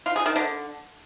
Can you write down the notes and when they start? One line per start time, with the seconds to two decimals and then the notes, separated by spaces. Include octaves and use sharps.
0.06 F4
0.16 G#4
0.26 D#3
0.36 D3